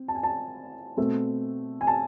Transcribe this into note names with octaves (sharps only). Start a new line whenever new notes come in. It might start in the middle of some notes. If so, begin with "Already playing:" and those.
Already playing: C4
A5
G#5
A5
B2 A3 C4
G#5
A5